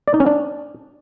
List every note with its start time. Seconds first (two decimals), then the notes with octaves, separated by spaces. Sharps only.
0.08 D5
0.14 D#4
0.20 C#4
0.26 D4